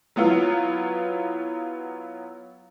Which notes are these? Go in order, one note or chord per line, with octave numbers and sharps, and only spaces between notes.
F#3 B3 E4 F4